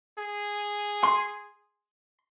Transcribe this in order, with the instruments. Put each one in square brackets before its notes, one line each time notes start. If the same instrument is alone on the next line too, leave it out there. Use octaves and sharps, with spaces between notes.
[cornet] G#4
[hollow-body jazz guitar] C6